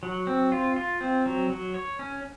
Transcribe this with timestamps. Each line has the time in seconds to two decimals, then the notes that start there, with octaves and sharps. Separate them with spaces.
0.03 F#3
0.27 C4
0.52 F4
0.76 F4
1.01 C4
1.26 F#3
1.50 F#3
1.74 C#5
1.99 C#4